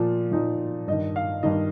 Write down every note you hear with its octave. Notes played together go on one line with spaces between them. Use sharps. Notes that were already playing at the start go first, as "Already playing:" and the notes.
Already playing: A#2 F3
A#2 F3 D#4
G2 D#3 D#5
F5
G2 D#3 D#5